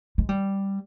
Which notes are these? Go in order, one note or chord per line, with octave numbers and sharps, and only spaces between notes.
G#3
G3